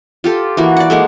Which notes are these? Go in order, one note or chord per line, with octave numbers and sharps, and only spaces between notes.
F4 G4 A4
E3 A#3 F#4
D5 F#5
G#3 A#3 A4